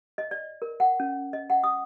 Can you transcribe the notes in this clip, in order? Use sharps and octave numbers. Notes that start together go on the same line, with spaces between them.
D#5
D5
A#4
F#5
C#4
D#5
F#5
D#6